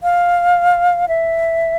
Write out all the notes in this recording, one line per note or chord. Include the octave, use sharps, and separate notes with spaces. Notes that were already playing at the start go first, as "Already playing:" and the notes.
F5
E5